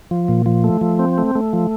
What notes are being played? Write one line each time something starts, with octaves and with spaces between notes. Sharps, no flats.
F3
A#2
F3
A3
F3
C4
A3
A3
F3